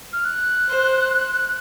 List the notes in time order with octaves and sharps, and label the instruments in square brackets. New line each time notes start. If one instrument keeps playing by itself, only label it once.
[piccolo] F6
F#6
[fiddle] C5